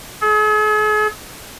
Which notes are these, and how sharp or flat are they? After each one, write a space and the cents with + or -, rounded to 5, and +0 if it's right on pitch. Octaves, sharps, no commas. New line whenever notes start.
G#4 +45